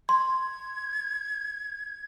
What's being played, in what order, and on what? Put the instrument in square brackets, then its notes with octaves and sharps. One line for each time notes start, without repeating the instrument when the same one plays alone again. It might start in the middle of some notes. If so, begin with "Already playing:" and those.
[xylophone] C6 [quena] G#6